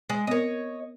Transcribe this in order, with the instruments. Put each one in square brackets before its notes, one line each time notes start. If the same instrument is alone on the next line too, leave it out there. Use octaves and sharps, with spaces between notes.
[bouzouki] G#3
[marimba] B3 C4 A#4 [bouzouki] C#5 D#5